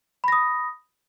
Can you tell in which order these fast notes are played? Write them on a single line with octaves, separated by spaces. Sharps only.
B5 A#6 D#6